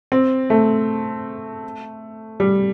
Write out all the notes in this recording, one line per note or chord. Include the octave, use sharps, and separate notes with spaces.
C4
A3
G3